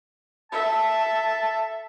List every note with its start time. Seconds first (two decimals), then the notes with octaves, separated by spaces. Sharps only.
0.52 A4 E5 A5